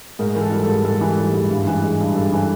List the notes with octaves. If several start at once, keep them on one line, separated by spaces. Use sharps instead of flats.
G#2 A#4
E3 A#4
A4
G3
A4
G#2
G#2 A4
E3
G3
G#2
G2
E3
G#3
G2
G2 A4
E3